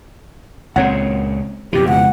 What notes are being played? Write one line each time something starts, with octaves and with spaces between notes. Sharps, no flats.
C#2 A#2 C#3 C4 C#5 F#5
F2 B2 E3 G4
C#2 F#5